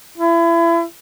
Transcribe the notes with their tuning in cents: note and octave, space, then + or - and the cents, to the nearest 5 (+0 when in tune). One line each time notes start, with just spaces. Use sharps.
E4 +30